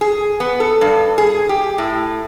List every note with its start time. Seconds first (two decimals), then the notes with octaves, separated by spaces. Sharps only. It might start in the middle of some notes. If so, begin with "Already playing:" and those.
0.01 G#4
0.40 B3
0.60 A4
0.81 G2
1.18 G#4
1.49 G4
1.78 A2